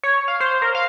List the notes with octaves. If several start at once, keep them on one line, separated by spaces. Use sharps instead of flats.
C#5
F5
C5
A#4
F5